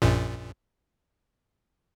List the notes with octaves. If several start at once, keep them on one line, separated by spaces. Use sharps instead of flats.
A#1 F#2 A#2